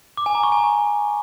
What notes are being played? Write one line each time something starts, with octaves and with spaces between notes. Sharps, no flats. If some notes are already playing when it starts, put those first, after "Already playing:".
D6
G#5
A#5
C#6
G#5